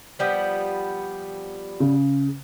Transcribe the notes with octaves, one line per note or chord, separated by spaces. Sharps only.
F3 G3 B3
C#3